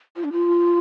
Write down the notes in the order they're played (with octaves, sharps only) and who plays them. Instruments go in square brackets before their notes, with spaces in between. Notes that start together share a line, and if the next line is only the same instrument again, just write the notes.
[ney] F4
D4
F4